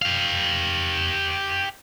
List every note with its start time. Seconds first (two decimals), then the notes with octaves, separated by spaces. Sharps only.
0.02 G4 F5